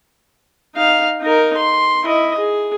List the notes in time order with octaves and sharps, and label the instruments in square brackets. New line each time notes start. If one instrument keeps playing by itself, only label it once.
[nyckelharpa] D#4 F5
D#4 A#4
C6
E4 D#5
G#4